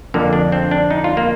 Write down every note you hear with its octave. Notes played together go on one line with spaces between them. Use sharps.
F2 D3 A#3
D4
C4
D4
D#4
F4
A#3